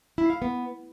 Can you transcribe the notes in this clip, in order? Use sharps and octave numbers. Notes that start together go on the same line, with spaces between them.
E4
F5
B3